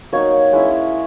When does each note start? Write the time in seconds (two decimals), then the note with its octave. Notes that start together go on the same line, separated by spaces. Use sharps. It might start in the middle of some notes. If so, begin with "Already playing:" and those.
0.13 F#3 A#3 D#4 C#5
0.53 G#3 C#4 E4